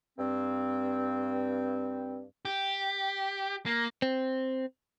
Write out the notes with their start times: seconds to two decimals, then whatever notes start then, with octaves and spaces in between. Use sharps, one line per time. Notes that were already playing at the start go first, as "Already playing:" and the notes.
0.18 G2 C4
2.45 G4
3.66 A#3
4.02 C4